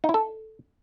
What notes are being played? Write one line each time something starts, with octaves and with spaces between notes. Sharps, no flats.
D#4
E4
A4